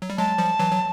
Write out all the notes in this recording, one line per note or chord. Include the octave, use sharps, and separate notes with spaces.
F#3
G3
F#3 G#3 A5
F3 G3
E3 F#3
F#3